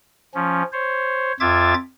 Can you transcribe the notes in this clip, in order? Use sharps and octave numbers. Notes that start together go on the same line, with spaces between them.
F3 C#4
C5 C#5
F2 F4 E5 D6 G#6 A6